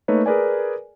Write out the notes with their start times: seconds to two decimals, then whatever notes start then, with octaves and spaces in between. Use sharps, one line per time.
0.08 A3 A#3 D#4 B4 C#5
0.26 G#4 A#4 B4 D5 G#5